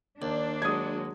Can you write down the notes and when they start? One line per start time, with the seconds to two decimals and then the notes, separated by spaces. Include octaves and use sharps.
0.22 D#2 D4
0.62 F#3 G#3 D#6 G#6